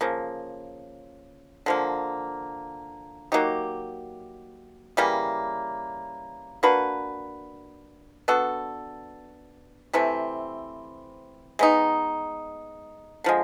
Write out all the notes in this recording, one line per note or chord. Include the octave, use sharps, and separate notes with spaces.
C#3 F3 A#3
D3 F3 A#3
F#3 A#3 D#4 G4
C#3 E3 G3 A#3
A#3 D4 F#4 B4
B3 D4 F#4 A4
C3 E3 A3 C4
G#3 B3 D#4
D3 F3 G#3